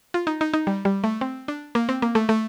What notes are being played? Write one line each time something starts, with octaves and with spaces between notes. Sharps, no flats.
F4
D#4
D#4
D#4
G3
G3
A3
C4
D4
A#3
C4
A#3
A3
A3